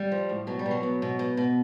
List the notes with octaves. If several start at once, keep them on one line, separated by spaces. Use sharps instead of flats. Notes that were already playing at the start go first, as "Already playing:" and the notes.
Already playing: G3
F3
A2
B2 F#3
G3
B2
F#3
B2
B2
B2
B2